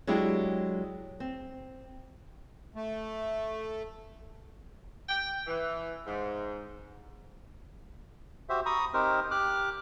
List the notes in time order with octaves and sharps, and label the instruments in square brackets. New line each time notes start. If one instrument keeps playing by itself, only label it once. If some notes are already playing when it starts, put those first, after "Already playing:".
[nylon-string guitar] F#3 G#3 D4 E4 G4
C4
[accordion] A3
[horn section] G5
E3
G#2
[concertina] F#4 G4 C5 E5
A#5 B5 C#6 D#6
C4 D#4 G4 A#4 C5
G4 D6 F6 F#6